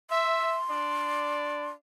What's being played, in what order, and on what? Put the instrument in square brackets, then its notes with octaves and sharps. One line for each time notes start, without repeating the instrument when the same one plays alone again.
[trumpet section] E5 [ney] C6
[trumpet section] D4 D5